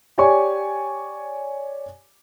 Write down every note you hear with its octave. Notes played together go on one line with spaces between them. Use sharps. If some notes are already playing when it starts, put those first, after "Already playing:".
G4 C#5 D5 G#5 C#6